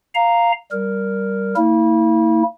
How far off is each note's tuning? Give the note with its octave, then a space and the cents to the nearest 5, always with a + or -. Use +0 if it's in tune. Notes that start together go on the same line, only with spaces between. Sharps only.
F5 +0 A#5 -5
G3 -15 A#4 +0
A#3 -35 E4 -30